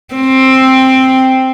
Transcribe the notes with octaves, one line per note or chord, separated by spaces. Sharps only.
C4